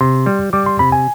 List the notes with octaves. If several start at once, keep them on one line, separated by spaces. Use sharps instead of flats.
C3 C6
G3
G3 D6
C6
C3 B5
G#5